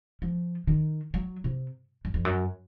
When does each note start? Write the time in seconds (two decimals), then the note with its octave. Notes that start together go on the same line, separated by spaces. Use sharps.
0.22 F3
0.67 D#3
1.14 F#3
1.44 C3
2.05 F#2
2.14 F2
2.25 F#2